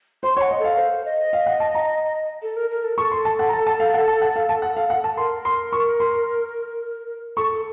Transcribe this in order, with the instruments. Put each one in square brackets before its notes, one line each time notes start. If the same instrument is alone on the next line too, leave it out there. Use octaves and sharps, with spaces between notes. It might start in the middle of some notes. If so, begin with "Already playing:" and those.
[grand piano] C5 [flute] C6
[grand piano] C#5
[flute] F#5
[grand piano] D#5
[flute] A4 [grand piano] F5
[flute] C5
D#5
[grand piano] F5
F#5
A5
A#5
[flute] A4
A#4
A#4
A4
[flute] A4 [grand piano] C#6
[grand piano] C6
A5
F#5
A#5
A5
A5
F5
F#5
A5
F#5
F5
A5
F#5
F5
F#5
A5
[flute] A#4 [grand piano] C6
[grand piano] C6
C#6
C6
[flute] A4 [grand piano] C#6